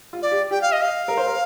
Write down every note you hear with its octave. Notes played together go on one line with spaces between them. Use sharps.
F4
D5
G4
G4 G5
F5
D#5
F5
A#4
C5
A#4